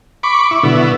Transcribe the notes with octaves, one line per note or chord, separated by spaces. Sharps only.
B5 C#6 D6
E4 C#6 D6
B2 D3 F#3 E4